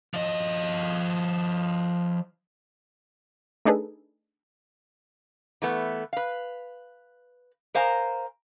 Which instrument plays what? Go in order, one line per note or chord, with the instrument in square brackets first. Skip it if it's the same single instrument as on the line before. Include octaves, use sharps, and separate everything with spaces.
[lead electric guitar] F3 D#5
[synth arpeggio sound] A3 D4 D#4 G#4 A4 B4
[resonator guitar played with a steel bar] E3 A3 B3
B4 F5
A#4 C5 F5 G#5 A#5